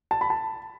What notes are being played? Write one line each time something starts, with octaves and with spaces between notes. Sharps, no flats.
A5
B5
A5